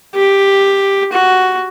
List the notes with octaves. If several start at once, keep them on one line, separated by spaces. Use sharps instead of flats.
G4
F#4